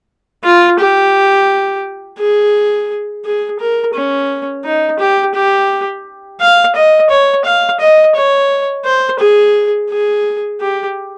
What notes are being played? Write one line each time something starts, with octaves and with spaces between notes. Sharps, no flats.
F4
G4
G#4
G#4
A#4
C#4
D#4
G4
G4
F5
D#5
C#5
F5
D#5
C#5
C5
G#4
G#4
G4